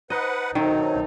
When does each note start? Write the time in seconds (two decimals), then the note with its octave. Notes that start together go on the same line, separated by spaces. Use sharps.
0.10 D#4 B4 C5 D#5 F#5 A5
0.55 D#3 F#3 A3 C4 D#4 A4